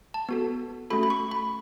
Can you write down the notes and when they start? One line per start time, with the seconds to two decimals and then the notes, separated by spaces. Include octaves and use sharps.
0.14 A5
0.29 B3 F#4 A4
0.90 A3 C#4 F#4 A4 B5
1.03 B5
1.10 C#6
1.31 B5